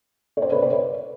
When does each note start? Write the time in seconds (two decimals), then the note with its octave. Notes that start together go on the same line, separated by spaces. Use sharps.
0.37 C#5
0.42 C5 D5
0.52 B4 C#5
0.62 C5 D5
0.72 B4 C#5